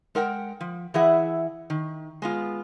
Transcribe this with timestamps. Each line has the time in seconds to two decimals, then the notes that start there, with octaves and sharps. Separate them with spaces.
0.15 G#3 A#4 F#5 G5
0.61 F3
0.94 E3 E4 G#4 E5 F#5
1.70 D#3
2.22 G#3 B3 F4